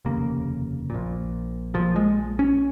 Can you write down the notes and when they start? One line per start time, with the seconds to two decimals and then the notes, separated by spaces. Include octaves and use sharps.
0.05 F1 D#2 C#3 A#3
0.90 A#1 A#2
1.74 A#1 A#2 F3
1.96 G#3
2.39 C#4